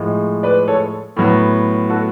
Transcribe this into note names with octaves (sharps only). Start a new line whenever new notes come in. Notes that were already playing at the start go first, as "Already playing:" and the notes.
Already playing: A2 F3 G#3
B4 D5
A4 C#5
A2 F#3 B3
F#4 A4